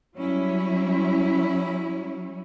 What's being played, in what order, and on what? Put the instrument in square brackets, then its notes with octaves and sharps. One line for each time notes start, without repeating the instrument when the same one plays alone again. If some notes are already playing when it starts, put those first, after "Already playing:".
[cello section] F#3 G3 C#4 E4